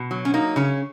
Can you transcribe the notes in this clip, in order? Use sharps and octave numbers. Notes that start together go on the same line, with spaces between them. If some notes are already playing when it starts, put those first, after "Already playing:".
Already playing: B2
F#3
C#4
A#3 D#4
C#3 C#4